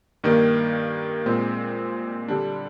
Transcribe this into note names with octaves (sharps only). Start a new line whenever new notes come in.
G2 D#3 A#3
A#2 G#3 C4
D3 G3 D4